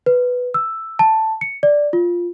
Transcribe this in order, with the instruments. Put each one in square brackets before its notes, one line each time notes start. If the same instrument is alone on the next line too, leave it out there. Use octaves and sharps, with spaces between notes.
[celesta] B4
E6
A5
C#7
D5
F4